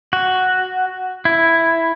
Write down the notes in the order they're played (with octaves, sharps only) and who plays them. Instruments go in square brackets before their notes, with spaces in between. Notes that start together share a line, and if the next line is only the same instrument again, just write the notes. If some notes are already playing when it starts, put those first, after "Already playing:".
[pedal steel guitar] F#4
E4